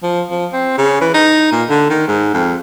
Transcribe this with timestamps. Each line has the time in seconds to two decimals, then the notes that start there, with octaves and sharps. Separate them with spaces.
0.03 F3
0.31 F3
0.53 C4
0.78 C#3
1.01 E3
1.14 D#4
1.52 A#2
1.69 D3
1.90 D#3
2.08 G#2
2.34 F2